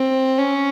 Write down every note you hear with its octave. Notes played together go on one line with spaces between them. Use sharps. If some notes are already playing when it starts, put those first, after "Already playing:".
Already playing: C4
C#4